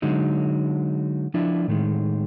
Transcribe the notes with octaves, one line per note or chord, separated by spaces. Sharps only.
D3 F#3 G#3 D#4
F3 D4 E4
A2 D#3 G#3